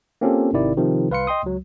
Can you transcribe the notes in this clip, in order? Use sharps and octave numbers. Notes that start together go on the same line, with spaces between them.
A#3 C4 C#4 F4 G4 A4
G#1 C3 D#3 E4 D5
C3 D#3 F3
C2 B4 F5 C6 C#7
D#5 G5 C6 D#6
C#2 F#3